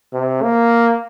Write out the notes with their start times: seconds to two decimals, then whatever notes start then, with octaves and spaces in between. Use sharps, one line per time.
0.14 C3
0.43 A#3